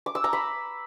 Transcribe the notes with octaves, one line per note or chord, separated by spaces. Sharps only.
D6
E6
A#5
B5